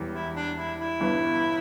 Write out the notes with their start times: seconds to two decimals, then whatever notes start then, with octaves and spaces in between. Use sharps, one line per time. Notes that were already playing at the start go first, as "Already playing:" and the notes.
Already playing: E1 E2 E3 G3
0.13 E4
0.35 D4
0.57 E4
0.78 E4
1.00 G1 G2 E3 B3